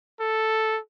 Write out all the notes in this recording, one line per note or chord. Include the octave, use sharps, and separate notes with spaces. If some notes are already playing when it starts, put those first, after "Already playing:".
A4